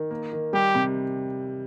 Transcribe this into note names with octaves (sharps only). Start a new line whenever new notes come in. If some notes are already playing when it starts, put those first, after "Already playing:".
Already playing: D#3
A#3
D#3
G3 G4
C3